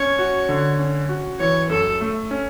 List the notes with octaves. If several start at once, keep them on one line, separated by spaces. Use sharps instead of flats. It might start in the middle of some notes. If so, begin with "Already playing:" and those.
Already playing: C#4 C#5
F#4
D3
C#4
F#4
E3 C#5
F#2 A4
A3
C#4